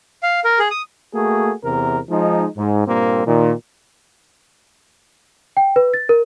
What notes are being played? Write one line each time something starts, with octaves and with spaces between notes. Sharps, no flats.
F5
A#4
G#4
D#6
A3 A#3 F#4 G#4
E2 C3 A#4
F3 G#3 D#4
G#2
G2 A#2 A#3 C4
A#2 D#3
G5
B4
A6
A#4